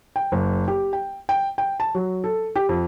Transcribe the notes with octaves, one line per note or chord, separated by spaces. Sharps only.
G5
F#1
G4
G5
G5
G5
A5
F#3
A4
G4
F2